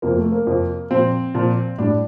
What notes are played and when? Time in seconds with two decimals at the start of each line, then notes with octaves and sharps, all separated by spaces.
0.02 F2 C3 F3 A#3
0.17 A3
0.32 A#3
0.47 F2 C3 F3
0.91 A#2 F3 C4
1.35 A#2 F3
1.78 A2 G3 D4